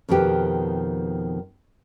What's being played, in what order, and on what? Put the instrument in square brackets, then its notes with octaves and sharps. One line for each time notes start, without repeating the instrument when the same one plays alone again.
[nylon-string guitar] F2 B2 D#3 F3 G4 B4